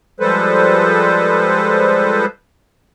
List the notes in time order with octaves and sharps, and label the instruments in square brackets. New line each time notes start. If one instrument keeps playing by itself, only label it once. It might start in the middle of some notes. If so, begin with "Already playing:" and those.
[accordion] F3 G3 G#3 A4 B4 C5